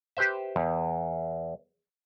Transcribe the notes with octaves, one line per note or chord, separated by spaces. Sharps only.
G4 B4 C5 E5
E2